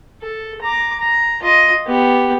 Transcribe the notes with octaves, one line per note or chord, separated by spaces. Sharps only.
A4
A#5 D6
A#5
F4 D#5
B3 G4